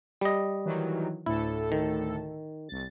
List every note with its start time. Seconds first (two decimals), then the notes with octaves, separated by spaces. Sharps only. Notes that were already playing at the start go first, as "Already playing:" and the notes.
0.21 G3 D#5
0.65 D#3 E3 F#3
1.26 D2 A2 E4 A4
1.72 D#3
2.69 C2 A6